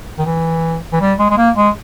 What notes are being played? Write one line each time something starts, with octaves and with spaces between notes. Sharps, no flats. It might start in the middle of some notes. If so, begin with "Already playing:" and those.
D#3
E3
E3
G3
G#3
G#3
A#3
G#3